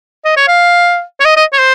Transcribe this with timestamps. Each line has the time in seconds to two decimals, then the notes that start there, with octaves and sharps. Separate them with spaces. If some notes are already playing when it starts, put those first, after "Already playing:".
0.25 D#5
0.37 C#5
0.48 F5
1.20 C#5
1.25 D#5
1.37 D#5
1.53 C#5
1.59 C5